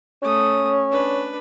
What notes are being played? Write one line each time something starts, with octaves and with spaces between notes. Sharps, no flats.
A3 C#4 D#6
D4 B4